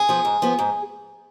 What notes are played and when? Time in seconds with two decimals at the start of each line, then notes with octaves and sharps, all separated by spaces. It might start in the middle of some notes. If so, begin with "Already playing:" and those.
Already playing: G#4
0.09 F3 B3
0.25 G#2
0.42 F3 B3
0.59 G#2